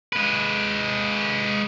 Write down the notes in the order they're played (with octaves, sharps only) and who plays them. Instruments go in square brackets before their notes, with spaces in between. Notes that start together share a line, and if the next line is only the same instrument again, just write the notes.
[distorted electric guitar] G#3 B4